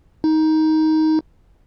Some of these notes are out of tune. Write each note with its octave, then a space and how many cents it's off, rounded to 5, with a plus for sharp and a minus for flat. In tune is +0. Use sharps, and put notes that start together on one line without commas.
D#4 +15